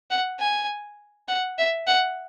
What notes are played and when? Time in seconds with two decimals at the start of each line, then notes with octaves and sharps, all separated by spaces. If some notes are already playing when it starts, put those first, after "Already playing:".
0.10 F#5
0.40 G#5
1.28 F#5
1.58 E5
1.87 F#5